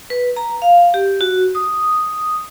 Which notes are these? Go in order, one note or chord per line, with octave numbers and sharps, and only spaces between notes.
B4
A#5
F5
G4
F#4
D#6